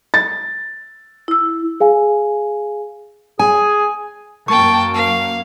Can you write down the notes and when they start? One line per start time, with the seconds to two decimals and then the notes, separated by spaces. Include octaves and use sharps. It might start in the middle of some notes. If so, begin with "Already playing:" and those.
0.14 A6
1.28 E4 E6
1.80 G#4 F5 G#5
3.39 G#4 G#5
4.48 F#2 A#3 G5 A5 C#6
4.94 F5